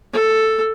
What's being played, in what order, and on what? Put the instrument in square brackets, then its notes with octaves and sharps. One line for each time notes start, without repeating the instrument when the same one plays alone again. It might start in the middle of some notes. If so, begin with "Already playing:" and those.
[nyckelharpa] A4